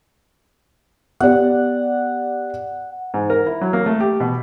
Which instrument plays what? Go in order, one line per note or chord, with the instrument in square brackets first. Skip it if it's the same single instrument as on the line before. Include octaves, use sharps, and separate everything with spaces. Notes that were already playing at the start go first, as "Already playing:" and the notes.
[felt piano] B3 G4 D5 [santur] F#5
[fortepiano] G#2
A#4
E4
F#3
A#3
A3
G4
B2